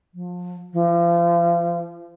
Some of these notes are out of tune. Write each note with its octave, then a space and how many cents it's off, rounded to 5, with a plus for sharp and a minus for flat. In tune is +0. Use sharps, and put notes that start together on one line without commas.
F3 +30
F3 -35